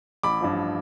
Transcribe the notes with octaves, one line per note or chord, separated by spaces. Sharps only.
A1 B5 D6
G2 F3